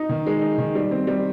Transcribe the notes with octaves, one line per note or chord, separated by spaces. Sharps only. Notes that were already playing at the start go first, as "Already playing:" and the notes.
Already playing: D#4
D#3
G#3
D#4
D#3
G3
C4
G3